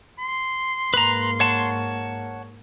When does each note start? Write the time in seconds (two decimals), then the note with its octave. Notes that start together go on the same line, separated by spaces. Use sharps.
0.19 C6
0.94 G#2 A#3 B4 A#5
1.40 C#5 F#5 A5